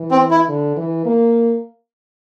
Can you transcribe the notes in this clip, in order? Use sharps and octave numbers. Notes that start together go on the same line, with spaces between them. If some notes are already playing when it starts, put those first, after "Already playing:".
Already playing: E3
C4
E4
D3
E3
A#3